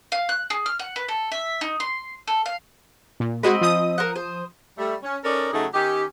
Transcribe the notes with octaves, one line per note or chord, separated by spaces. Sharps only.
F5
F#6
G#4
F6
F#5
B4
A4
E5
D#4
C6
A4
F5
A#2
G#3 C4 F#4 D#5 B5
F3 D#6
A#4 C5 F#5
C5
G3 A3
C#4
C#4 D#4 A4 A#4 D5
C#3 F#3 A3 D#4 G#4 A4
D#3 C#4 D#4 G4